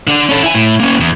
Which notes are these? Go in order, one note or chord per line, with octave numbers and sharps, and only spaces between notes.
D3 D4
C#4 A4
E4 G#5
A2
A#3 C#4
E2